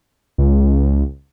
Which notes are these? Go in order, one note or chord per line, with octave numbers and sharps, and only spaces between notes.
C#2